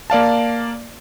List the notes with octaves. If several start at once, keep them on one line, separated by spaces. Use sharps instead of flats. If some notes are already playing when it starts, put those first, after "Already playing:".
A#3 D5 F5 A5